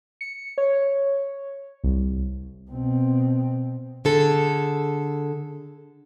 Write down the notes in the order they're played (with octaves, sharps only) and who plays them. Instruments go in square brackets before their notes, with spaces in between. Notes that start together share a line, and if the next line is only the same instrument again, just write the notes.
[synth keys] C#7
C#5
C2
[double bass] B2 C4
[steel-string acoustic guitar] D3 G#4 A4